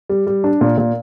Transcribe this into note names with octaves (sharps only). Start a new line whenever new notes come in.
G3
G3
D4
A#2
A#2